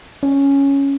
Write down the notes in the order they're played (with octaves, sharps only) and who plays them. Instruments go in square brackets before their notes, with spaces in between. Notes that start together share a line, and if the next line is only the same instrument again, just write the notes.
[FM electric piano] C#4